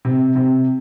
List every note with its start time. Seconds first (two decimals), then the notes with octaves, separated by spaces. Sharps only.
0.05 C3
0.35 C3